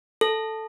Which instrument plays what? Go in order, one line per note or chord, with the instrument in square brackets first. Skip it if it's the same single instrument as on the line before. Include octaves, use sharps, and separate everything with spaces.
[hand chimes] A4